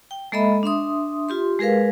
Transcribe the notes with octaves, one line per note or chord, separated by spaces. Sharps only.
G5
G#3 A#3 A4 D#5 E5 B5
D4 E5 C6 D#6
F4 G4 C6
G#3 G#4 A#4 B4 F5